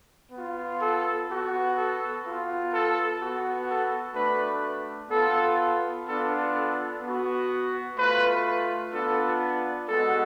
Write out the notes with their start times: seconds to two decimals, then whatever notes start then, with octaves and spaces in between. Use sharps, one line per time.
0.32 B3 F4
0.80 A4
1.29 B3 F#4
1.76 A4
2.24 B3 F4
2.72 A4
3.20 B3 F#4
3.68 A4
4.15 A3 D4 F#4 B4
5.11 B3 F4 A4
6.06 B3 D4 F4 A4
6.54 A4
7.02 B3 F#4
7.97 A3 F4 B4
8.93 B3 D4 F4 A4
9.89 G#3 B3 F#4 A4